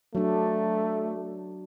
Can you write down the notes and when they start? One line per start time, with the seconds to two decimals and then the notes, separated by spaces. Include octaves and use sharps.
0.15 F#3 A3 D4